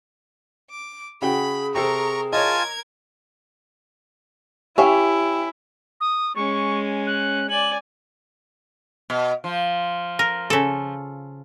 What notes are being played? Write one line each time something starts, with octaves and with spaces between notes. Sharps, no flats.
D6
C#3 F#4 G#4 G5 B5
C3 C4 A4 A#4 A#5 C#6
F4 A#4 C#5 D#5 G#5 A5 G#6
C#4 E4 G4 E5 F5
D#6
G#3 C#4 C#6
F#6
D5 G#5 F#7
B2
F3
A#4
C#3 A4